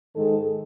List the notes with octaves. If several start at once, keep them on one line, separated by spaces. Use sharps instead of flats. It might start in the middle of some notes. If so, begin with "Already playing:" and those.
G#2 D#3 G#3 A4